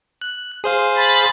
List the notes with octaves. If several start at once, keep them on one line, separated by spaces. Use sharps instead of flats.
F#6
G#4 C5 F5
B5 A6